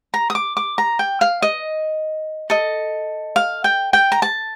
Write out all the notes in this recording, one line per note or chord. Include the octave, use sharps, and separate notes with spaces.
A#5
D#6
D6
D6
A#5
G5
F5
D#5
A4 D#5
F5
G5
G5
A#5
A5